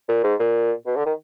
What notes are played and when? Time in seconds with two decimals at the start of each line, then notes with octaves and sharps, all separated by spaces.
0.09 A#2
0.24 G#2
0.39 A#2
0.86 B2
0.96 D3
1.06 D#3